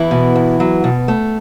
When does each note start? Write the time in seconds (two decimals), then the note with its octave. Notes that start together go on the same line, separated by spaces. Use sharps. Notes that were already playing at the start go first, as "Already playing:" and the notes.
Already playing: E2 E3 E4
0.11 B2
0.36 E2
0.60 F#3
0.84 B2
1.08 A3